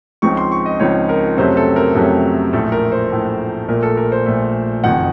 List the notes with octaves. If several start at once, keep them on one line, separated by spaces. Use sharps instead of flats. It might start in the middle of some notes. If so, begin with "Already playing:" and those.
C#2 C#3 F3 C4 D#4 C#6
C6
C#6
D#5
C#2 C#3 F3 C4 D#4 C#5
A#4
F2 C3 F#3 A3 C#4 C5
A4
A#4
F2 C3 F#3 A3 C#4
A#1 A2 A3 A4
A#4
C5
A#1 A2 A3
A#1 A#2 A3 A#4
A4
A#4
C5
A#1 A#2 A3
F#1 F2 D#3 F#5